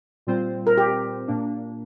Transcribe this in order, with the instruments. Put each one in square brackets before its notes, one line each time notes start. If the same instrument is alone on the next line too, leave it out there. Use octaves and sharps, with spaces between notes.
[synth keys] A#2 G3 C4 F4 C5
[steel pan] A#4
G4
[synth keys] A#2 A#3 D4